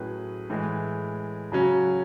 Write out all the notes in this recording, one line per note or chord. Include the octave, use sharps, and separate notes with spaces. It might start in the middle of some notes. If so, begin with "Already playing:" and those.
Already playing: A2 F#3 C#4 G#4 B4
A2 E3 G#3
C#3 F#3 C#4 F#4